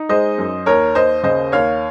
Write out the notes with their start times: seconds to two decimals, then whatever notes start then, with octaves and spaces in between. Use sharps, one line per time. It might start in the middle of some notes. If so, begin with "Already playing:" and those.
Already playing: D#4
0.09 G#3 C5 D#5
0.38 F#2
0.66 D#2 A#4 C#5
0.95 D#2 C5 D#5
1.23 C#3 C5 D#5
1.52 D#2 C#5 F5